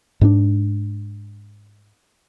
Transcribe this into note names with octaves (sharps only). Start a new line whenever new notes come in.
G#2 C4 D4